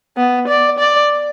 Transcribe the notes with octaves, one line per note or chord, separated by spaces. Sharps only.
B3
D5
D5